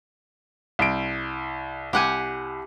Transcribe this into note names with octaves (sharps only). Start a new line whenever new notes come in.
C2 D7
C2 G4 F#5 G#5